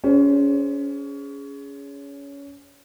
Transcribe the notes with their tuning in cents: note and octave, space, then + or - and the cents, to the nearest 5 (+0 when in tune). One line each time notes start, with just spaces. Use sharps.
C#4 +25 G#4 +0 C5 +0